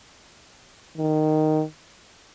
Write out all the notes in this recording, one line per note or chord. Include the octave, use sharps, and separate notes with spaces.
D#3